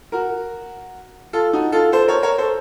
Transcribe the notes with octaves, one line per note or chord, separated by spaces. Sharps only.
F#4 A#4
F4 A4
D#4 F#4
F4 A4
A4 C5
A#4 C#5
A#4 C#5
A4 C5